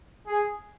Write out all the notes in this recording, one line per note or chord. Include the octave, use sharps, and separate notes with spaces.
G#4